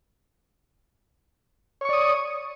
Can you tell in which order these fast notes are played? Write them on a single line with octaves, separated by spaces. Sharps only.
C#5 C#6 D5 D#6